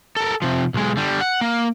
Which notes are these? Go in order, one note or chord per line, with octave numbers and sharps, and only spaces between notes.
A4 A#4
C3 F3
B1 G#3
D3 G3
F#5
A#3